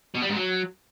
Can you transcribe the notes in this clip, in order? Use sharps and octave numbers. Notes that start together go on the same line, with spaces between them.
B2
G3
G#2
F#3